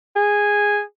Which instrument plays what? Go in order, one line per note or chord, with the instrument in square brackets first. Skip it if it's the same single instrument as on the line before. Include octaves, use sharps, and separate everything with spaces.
[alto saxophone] G#4